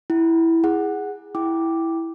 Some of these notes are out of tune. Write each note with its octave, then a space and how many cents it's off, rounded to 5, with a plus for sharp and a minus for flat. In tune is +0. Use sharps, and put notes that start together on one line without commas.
E4 +0 F#5 +45
G#4 -15 F#5 +0
E4 +0 G5 +0 D6 +0